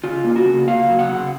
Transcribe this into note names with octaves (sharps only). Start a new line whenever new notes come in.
C#3 F4
A#3
F#4
C#3
A#3 F5
F#3
F#5
C#3